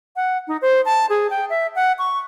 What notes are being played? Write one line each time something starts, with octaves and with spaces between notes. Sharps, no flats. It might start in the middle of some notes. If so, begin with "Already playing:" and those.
F#5
D#4
C5
A5
G#4
G5
E5
F#5
C#6